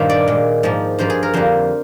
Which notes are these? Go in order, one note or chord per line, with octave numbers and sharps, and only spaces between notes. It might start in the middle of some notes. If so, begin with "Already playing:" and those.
Already playing: G2 A#2 D#3 G3 A#3 C5
D5
A#2 G#3
G#2 F3 A#3
G2 F3 A#3 C5
G#4
A#4
F2 D3 G3 A#3 C5